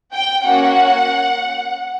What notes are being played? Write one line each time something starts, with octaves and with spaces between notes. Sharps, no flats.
G5
A#3 C#4 F#4 F#5